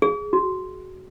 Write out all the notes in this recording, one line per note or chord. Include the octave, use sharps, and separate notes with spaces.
G#4
F#4